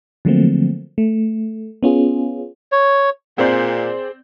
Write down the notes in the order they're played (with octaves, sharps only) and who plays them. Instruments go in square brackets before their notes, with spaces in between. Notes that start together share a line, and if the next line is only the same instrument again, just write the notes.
[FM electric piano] D3 F3 F#3 A3 A#3 C4
A3
B3 C#4 F4 G#4
[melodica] C#5
[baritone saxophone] A#2 [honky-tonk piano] C4 D5 G6 [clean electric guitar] G#4 C5